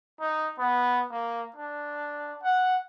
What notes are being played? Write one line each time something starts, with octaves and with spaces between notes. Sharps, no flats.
D#4
B3
A#3
D4
F#5